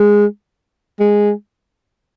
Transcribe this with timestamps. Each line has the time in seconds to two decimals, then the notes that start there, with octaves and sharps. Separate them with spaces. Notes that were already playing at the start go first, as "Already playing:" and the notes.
Already playing: G#3
1.00 G#3